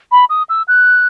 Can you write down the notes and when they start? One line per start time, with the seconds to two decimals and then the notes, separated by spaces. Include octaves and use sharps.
0.12 B5
0.30 D#6
0.49 E6
0.68 F#6